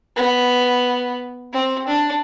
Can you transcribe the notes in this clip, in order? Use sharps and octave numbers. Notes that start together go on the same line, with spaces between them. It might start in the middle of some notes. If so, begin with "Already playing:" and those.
B3
C4
D4